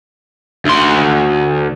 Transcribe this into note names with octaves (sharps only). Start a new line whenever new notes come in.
D2 C6